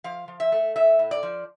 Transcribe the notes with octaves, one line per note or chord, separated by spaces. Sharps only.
F3 F5
F3
E5
A3
A3 E5
A2
D5
F3